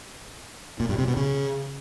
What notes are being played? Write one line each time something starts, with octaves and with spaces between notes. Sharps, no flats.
A#2
G2
C3
B2
C#3